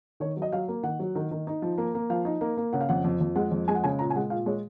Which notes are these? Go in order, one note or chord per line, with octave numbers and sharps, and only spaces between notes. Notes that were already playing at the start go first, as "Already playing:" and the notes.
D#3 C#5
F#3
D#5
F#3 F5
A#3
D#3 F#5
F#3
D#3
D#3
D#4
F3
A#3
A#3
F3 F5
D#4
A#3
A#3
C#3 F#5
F5
F2 F#5
F2
F2
G#3 F#5
F2
G#3 G#5
F#5
C#3 G#5
A#2 A#5
G#5
G#3 F#5
A#2 F5
G#3 C#5